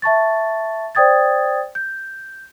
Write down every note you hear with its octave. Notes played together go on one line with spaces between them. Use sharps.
E5 A5 C#6 A6
C5 D5 G5 D#6 G#6 A6
G6